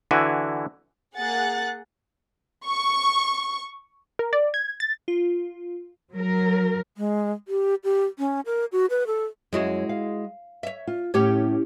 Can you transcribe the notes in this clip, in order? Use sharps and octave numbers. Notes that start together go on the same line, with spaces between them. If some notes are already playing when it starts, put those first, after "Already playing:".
D3 E3 E4 F#4 G#5
A#3 G#4 F#5 F#6 A6
C#6
A#4
D5
G#6
A6
F4
F#3 A#4
G#3
G4
G4
C#4
A#4
F#4
B4
A4
F#2 G#3 E4 F#4
F5
C#5 E5
F4
A2 C#4 G4 C#5